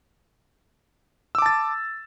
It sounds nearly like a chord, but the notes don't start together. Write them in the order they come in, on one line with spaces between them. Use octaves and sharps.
E6 D6 A5 A6